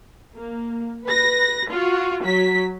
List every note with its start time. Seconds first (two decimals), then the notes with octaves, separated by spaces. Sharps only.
0.35 A#3
1.06 B4 A#6
1.72 F4 F#4
2.24 F#3 B6